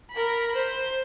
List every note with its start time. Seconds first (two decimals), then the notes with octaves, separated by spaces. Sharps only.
0.12 A#4 B5
0.56 C5